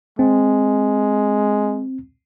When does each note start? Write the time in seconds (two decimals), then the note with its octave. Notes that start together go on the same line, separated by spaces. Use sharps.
0.19 G#3 C4